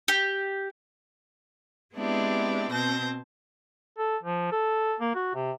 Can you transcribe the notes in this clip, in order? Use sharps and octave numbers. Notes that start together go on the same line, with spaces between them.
G4
G#3 B3 C4 D4 E4 G4
B2 C4 A5 G6 A#6
A4
F3
A4
A#3
F#4
C3